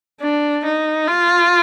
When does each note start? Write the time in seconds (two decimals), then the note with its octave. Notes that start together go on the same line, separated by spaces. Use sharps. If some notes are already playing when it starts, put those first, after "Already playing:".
0.21 D4
0.65 D#4
1.07 F4